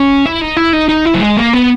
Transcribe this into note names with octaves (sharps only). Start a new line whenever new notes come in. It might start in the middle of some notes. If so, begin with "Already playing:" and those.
Already playing: C#4
E4
D#4
E4
D#4
D#4
E4
F#3
G#3
A#3
B3